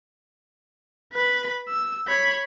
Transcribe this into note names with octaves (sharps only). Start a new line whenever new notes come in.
B4 B5
E6
C#5 B5